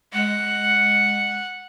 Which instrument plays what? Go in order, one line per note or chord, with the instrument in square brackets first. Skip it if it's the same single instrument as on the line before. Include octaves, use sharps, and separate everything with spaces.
[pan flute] G#3 [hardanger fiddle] F#5